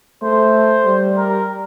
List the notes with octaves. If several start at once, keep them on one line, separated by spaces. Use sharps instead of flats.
A3 C5
G3
A#4